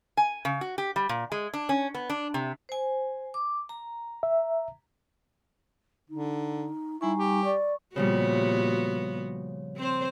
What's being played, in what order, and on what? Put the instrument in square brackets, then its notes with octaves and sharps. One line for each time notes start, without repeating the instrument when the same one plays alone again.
[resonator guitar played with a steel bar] G#5
C#3
F#4
G4
G3
A#2
G#3
D4
C#4
B3
D4
C3
[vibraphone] C5 G#5
D6
A#5
[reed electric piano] E5
[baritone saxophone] D3 [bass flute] D#4
[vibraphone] G3 G#5 C#6 [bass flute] D#4 [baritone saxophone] E4
[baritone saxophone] G4
[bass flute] D5 [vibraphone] C#6
[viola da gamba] A#2 B3 F#4 [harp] C#3 F3 G3
[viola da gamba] C4 C5